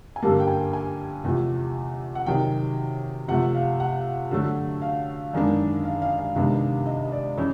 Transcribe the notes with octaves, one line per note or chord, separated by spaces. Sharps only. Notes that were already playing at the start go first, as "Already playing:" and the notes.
G#5
G2 D3 G3 A#3 A5
G5
G#5
G#5
E2 C3 F3 A3
F#5
C3 D#3 F#3 G5
C3 F3 A3 F#5
F5
F#5
D3 F#3 A3
F5
F#2 D#3 G#3 B3 D4
F5
F5
F5
C3 D#3 G#3 B3 D4
D#5
D5
C#3 E3